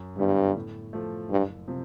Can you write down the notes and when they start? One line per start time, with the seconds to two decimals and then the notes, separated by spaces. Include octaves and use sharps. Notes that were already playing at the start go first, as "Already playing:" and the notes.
Already playing: F#2
0.18 G2 D3 G3 B3 E4
0.56 A2
0.93 F3 A3
1.30 F#1 G2
1.68 C3 F3